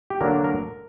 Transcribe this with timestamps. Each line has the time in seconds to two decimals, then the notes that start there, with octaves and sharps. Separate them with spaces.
0.10 G4
0.21 D3 F#3 A#3 D4 A#4
0.44 A#4